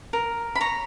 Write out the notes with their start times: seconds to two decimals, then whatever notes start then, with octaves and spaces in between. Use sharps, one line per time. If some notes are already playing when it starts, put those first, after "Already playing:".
0.13 A#4
0.55 B5
0.61 C#5 A#5